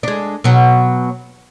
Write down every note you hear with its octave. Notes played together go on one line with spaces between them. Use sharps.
G#3 D4
B2 F#3